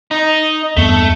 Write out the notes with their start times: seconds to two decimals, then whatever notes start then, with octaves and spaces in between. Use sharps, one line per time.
0.11 D#4
0.77 E2 G2 A3 B3